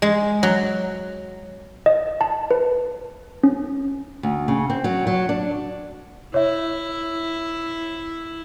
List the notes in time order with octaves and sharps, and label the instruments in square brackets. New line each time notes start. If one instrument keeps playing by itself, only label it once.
[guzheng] G#3
F#3
[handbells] D#5
A5
B4
C#4
[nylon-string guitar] D2
C#3
C4
F#3
F#3
D4
[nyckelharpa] E4 [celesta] C#5 E5